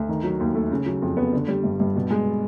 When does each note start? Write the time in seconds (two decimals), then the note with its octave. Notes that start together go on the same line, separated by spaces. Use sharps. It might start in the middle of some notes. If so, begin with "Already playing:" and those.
Already playing: D2
0.09 D#3
0.23 F#3
0.40 D#2
0.55 A3
0.71 C#3
0.86 F#3
1.02 F2
1.17 B3
1.33 D3
1.48 G3
1.64 G2
1.80 G2
1.96 B2
2.10 G#3